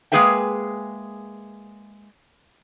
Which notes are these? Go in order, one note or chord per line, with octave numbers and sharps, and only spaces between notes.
G#3 A#3 G#4 B4 E5 G5